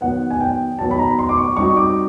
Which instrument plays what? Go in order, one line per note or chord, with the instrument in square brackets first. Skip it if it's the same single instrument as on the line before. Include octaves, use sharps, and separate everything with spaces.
[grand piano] D#3 F#3 B3 [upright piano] F#5
[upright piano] G#5
G5
[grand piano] D#3 F#3 B3 [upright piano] A5
[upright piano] B5
A#5
C6
D6
C#6
[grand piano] G3 C4 D#4 F#4 [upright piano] C#6
[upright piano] D6